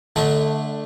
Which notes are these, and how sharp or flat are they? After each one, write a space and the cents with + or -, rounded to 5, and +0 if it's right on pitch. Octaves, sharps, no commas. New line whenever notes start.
D3 +0 A3 +0 D#5 +45